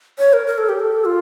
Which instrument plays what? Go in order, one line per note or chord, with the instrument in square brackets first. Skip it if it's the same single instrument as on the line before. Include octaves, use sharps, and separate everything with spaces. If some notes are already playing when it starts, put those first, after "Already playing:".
[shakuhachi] C#5
A#4
A#4
A4
G4
A4
F4